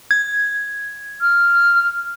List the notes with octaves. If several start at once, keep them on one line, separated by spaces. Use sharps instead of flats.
G#6
F6